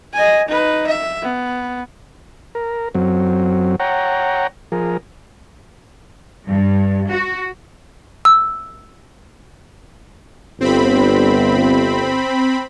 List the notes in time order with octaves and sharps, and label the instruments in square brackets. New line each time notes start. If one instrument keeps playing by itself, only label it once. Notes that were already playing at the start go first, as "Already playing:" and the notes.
[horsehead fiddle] D#5 G#5
D#4 B4
E5
B3
[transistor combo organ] A#4
F#2 F#3 C4
C#5 F#5 G5 A#5
F3 G#4 A#4
[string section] G2
F#4
[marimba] E6
[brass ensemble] G1 [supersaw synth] C4 B5